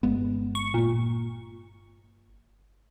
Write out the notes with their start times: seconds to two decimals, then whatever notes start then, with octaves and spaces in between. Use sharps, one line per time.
0.03 G1 G#3 B3
0.55 C#6
0.74 A#2